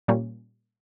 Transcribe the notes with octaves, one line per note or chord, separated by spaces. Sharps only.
A#2 G3 A#3 C#4